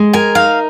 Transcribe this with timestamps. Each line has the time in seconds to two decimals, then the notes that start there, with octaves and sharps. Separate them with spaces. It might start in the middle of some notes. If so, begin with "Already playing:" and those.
Already playing: G#3
0.13 A#4 G#5
0.35 D#4 F5